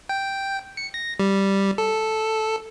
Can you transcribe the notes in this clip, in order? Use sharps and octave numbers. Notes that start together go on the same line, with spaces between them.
G5
C#7
A#6
G3
A4